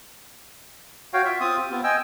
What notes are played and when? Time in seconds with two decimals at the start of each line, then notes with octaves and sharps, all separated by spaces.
1.13 F#4 C#5 F5 G5
1.25 F4 E5
1.41 C4 F4 D#6
1.58 G4
1.71 B3 C4 F4
1.84 D#5 G5 G#5 E6